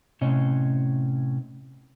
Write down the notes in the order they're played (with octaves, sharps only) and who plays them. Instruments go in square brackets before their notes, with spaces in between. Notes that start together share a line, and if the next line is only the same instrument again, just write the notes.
[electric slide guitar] A2 C3 C#4 C#5 D#5